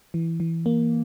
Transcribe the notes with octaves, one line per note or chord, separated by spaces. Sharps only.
E3
E3
A#3